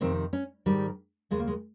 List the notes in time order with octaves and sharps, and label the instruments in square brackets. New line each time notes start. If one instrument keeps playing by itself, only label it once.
[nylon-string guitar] F2 C3 D#3 C4
C#4
G#2 D#3 G3
D#2 C#3 G#3
A#3
G#3